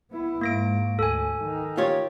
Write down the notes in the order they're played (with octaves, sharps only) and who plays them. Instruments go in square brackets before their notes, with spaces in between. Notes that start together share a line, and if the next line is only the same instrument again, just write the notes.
[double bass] B3 E4
[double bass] G#2 [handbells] A#3 A#6 D7
[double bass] D2 [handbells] A4 G#5
[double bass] D#3
[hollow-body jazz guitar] F4 G4 C#5